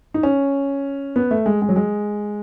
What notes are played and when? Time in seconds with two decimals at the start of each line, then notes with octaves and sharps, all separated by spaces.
0.14 D#4
0.23 C#4
1.16 B3
1.31 A3
1.46 G#3
1.62 G#3
1.69 F#3
1.76 G#3